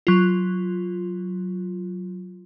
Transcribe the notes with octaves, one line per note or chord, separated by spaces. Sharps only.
F#3 F4